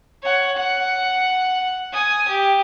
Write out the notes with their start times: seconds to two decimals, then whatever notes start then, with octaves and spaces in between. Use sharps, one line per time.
0.22 C#5 F#5
0.56 F#5
1.92 G#5 D#6
2.28 G4